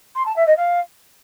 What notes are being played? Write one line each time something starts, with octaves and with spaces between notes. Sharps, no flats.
C6
A5
E5
D#5
F5